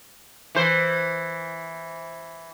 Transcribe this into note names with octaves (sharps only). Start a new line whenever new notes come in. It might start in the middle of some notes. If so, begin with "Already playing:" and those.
E3 C5